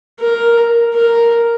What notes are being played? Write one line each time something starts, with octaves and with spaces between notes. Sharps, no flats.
A#4
A#4